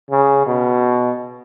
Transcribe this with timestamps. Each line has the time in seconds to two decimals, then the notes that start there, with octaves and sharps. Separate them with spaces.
0.11 C#3
0.47 B2